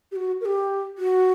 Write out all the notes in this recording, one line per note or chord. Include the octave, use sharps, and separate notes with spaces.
G4
F#4
A#4
G4
F#4